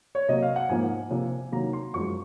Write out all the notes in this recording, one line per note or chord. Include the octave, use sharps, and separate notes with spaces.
C#5
C3 F#3 A#3 D#5
F5
F#5
G#2 F3 A#3 G#5
C3 F3 A#3
C3 D#3 F#3 A#3 A#5
C6
F#2 F3 G#3 C#6